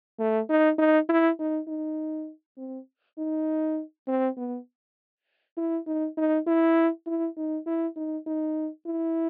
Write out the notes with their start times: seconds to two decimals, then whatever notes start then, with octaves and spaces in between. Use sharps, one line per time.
0.19 A3
0.50 D#4
0.78 D#4
1.09 E4
1.39 D#4
1.68 D#4
2.58 C4
3.18 D#4
4.08 C4
4.37 B3
5.58 E4
5.87 D#4
6.18 D#4
6.47 E4
7.07 E4
7.37 D#4
7.67 E4
7.97 D#4
8.27 D#4
8.86 E4